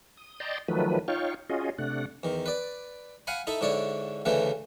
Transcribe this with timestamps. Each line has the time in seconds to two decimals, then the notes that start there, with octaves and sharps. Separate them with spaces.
0.17 D#6
0.40 D5 D#5 G5 A5 A#5 C6
0.68 D#3 F3 F#3 A3 B4
1.08 D#4 F4 C#5 F5 G5 C#6
1.49 C#4 F4 F#4 G#4 D#5
1.79 C3 A3 D4 F#5
2.23 E2 D#3
2.46 B4 D5
3.27 F5 F#5 G#5 B5
3.47 D#4 E4 A4 E5
3.61 G#2 D3 E4 C#5 D5
4.25 D2 C#3 E3 A3 D4 B4